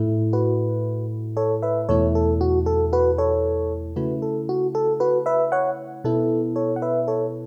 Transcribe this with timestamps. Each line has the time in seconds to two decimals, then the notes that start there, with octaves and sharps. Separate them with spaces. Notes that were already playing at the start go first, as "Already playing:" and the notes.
Already playing: A2 A3 E4
0.33 F#4 B4
1.37 A4 C#5
1.62 B4 E5
1.89 E2 B2 A3 E4 A4 C#5
2.15 A4
2.41 F#4
2.66 A4
2.93 F#4 B4
3.18 A4 C#5
3.96 C#3 A3 E4 F#4 B4
4.22 A4
4.49 F#4
4.75 A4
5.00 F#4 B4
5.26 B4 E5
5.52 C#5 F#5
6.04 B2 B3 E4 A4
6.56 A4 C#5
6.76 F#5
6.82 B4 E5
7.08 A4 C#5